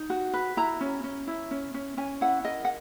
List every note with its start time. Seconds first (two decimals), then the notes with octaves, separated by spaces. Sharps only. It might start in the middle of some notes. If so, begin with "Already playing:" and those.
Already playing: D#4
0.10 F#4
0.33 B4
0.57 E4 A#5
0.81 C#4
1.04 C#4
1.27 E4
1.51 C#4
1.74 C#4
1.97 C#4 G#5
2.21 E4 F#5
2.45 A#4 D#5
2.65 F#5